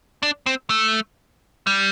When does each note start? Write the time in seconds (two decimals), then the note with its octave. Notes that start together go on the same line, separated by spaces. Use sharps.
0.23 D4
0.46 C4
0.70 A3
1.67 G3